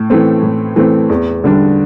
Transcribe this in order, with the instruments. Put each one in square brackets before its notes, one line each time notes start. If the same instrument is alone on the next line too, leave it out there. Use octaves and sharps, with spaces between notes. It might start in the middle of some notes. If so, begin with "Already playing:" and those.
Already playing: [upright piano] A2
E3 A3 C4
A2
E3 A3 C4
E2
D3 G3 D4